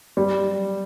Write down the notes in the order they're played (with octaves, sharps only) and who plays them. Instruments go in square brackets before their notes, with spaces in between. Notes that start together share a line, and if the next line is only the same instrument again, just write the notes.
[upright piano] G3